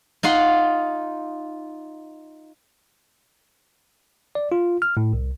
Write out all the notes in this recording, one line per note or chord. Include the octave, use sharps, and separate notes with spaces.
D#4 F4 F#5 C6
D5
F4
F6
A2
C2